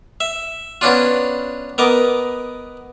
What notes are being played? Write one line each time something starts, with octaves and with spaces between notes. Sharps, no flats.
E5
B3 C#4 D4 F4
B3 A#4 D#5 D6